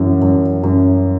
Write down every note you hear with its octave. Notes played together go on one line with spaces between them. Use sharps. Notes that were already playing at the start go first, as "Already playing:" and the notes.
Already playing: F#2 E3
F#2
F#2